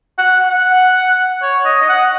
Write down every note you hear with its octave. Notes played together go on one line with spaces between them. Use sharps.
F#5
F#5
C#5
D#5
D#5
F#5